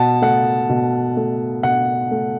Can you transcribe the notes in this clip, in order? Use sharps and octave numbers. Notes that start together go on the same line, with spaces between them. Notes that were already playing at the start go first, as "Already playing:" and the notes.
Already playing: B2 F#5 A5
A3 F#5
B2
A3
B2 F#5
A3